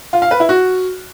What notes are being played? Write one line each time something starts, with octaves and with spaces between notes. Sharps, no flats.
F4
F5
B4
E4
F#4